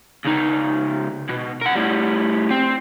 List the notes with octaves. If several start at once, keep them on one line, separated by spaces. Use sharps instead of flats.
C#2 D#4
B2
A#4 F#5
A2 G3
C4